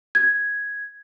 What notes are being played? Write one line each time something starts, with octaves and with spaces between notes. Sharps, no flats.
G#6